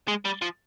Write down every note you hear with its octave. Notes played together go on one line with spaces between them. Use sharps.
G#3
G3
F3